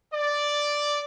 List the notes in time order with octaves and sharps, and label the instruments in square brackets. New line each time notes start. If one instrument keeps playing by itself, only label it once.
[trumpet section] D5